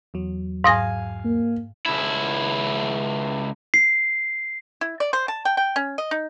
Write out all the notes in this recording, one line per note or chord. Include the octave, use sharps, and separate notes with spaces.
E2 F#3
G#2 F5 G#5 D#6 A#6
A#3
C#2 E4
C7
E4
D5
C5
A5
G5
G5
C#4
D#5
D#4